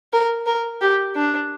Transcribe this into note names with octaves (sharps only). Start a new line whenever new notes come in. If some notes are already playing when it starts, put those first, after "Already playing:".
A#4
A#4
G4
D4